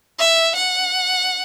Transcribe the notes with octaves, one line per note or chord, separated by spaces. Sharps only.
E5
F#5